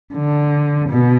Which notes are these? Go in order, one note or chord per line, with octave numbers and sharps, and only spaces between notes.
D3
B2